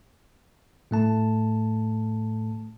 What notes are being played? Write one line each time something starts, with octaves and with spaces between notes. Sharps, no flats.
A2 A3 A5